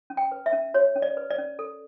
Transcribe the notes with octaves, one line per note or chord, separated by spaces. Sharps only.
C#4
G5
B4
E5
C#4
F#4 C#5
C#4
D5
B4
D5
C#4
A4